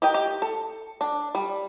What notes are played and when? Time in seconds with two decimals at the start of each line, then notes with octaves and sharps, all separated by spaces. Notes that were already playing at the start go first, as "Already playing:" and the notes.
0.02 G4 A#4 D#5 G5
0.14 G4
0.42 A4
1.01 D4
1.35 G3